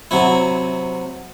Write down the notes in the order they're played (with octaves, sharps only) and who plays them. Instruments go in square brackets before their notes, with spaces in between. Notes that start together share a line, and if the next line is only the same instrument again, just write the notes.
[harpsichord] C3 F#3 E4